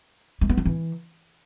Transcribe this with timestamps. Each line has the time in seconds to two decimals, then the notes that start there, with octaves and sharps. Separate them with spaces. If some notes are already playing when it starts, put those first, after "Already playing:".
0.41 G#3
0.49 B3
0.58 F3
0.66 E3